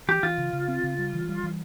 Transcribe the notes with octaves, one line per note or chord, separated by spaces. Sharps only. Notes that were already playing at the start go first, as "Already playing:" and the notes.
E3 G4
E3 F4
C#3
C#3
C4
C#3
G3
E3
G3
E3